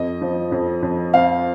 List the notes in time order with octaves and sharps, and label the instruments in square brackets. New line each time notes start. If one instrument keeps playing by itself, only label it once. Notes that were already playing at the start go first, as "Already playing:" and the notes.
Already playing: [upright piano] F2 C4 [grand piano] D#5
[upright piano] F3
F2
F2
[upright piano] C4 [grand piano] F5